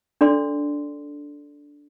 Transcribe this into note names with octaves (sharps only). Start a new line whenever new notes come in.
D4 A4 D5 C6